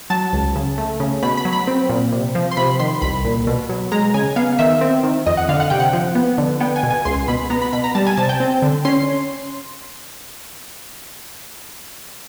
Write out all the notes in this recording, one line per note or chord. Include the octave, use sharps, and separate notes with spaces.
F#3 A5
C#2
C#3
A3
C#3
B2 B5
B5
F#3
B5
C4
A#2
C3
F3
C6
C3 B5
D#3 C6
C2 B5
A#2
B2
F#3
G#3 A#5
C#3 G#5
B3 F5
D#3 E5
C4
D#3
F2 D#5
F#5
D3 F5
F#5
C3 G5
F#5
F3
B3
D3
B3 G5
G#5
B2
G#5
C#2 C6
B2 B5
B3 A#5
B5
B2 B5
A#5
G3 A5
G#5
C3 A5
G5
C4
D3
C#4 C6